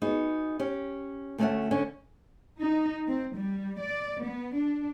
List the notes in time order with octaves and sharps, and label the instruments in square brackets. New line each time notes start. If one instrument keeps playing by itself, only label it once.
[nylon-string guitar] B3 D#4 F#4 G#4
C#4 G4
D2 A3 B3 C#4 E5 F#5
D3 C#4
[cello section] D#4
C4
G3
D5
B3
D4